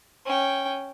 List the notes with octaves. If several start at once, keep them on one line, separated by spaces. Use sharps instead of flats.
C#4 G5